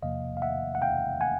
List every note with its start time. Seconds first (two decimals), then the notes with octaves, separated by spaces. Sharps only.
0.02 E2 C3 F3 A#3 D#5 F5
0.37 F5
0.42 E5 F#5
0.75 F#5
0.82 F5 G5
1.21 F#5 G#5